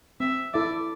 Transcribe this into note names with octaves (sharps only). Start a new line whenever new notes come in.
C4 E5
E4 A4 D5 E5